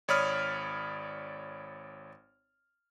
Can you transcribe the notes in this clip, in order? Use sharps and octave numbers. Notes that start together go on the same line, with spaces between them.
G#1 C#5 D5 B5 D#6 F6